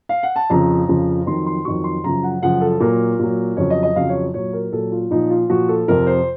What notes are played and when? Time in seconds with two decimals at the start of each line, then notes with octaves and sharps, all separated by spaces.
0.09 F5
0.23 F#5
0.36 A5
0.50 F2 C#3 F3 A#5
0.88 F2 C#3 F3
1.26 F2 D#3 F#3 C6
1.46 C6
1.65 F2 D#3 F#3 C#6
1.84 C6
2.03 F#2 C#3 F3 A#5
2.23 F#5
2.42 F#2 C#3 F3 F#5
2.61 A4
2.80 A#2 F#3 A#4
3.19 A#2 F#3
3.57 F2 C#3 F#3 C#5
3.70 D#5
3.83 D#5
3.96 F2 C#3 F#3 F5
4.09 C#5
4.34 A#2 F#3 C#5
4.53 A#4
4.72 A#2 F#3 A4
4.92 F4
5.10 A#2 F3 D#4
5.30 F4
5.49 A#2 F3 F#4
5.69 A4
5.88 F2 C3 F3 A#4
6.07 C5